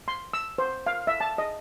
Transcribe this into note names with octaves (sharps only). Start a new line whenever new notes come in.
C6
E6
C5
F5
E5
A5
D#5